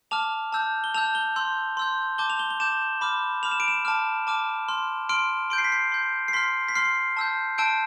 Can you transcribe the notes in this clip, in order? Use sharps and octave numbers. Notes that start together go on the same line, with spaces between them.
A5 D6 F6 F7
A5 E6 G6
G7
A5 E6 G6 F7
G7
C6 E6 G6
C6 E6 G6
A5 D6 G6 G7
F7
G7
G7
A5 D6 G6 E7
B5 D6 F6
B5 D6 F6 F7
E7
D7
E7
A5 D6 F6
A5 D6 F6
C6 F6
C6 F6 D7
C6 G6 D7
C7
B6
C7
C6 G6
C7
C6 F6 B6
B6
C6 F6 C7
A5 E6 G6
A5 E6 G6 D7